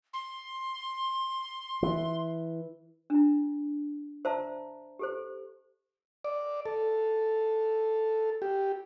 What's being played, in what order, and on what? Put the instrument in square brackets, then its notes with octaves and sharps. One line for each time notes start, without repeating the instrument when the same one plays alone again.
[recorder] C6
[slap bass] E3
[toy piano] D4 E4
C5 D5 E5 A5 A#5
G4 A4 C5
[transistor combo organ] D5
A4
G4